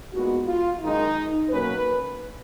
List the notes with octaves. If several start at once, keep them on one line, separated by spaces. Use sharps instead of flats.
A#2 G#3 B3 D#4 F#4
F4
F#2 D#3 G#3 D#4
B2 F#3 A#3 C#4 B4